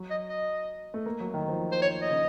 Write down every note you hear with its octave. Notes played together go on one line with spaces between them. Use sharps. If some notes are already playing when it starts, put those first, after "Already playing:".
Already playing: F#3
D#5
D#5
A3
A#3
F#3
D#3
F3
C5
C#5
D#5
C#3